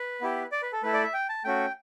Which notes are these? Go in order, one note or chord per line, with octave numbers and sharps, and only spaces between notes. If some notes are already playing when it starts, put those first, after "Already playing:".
Already playing: B4
B3 E4 G4
D5
B4
A4
A3 E4 A4 B4
D5
E5
G5
A5
A3 C#4 F#4 G5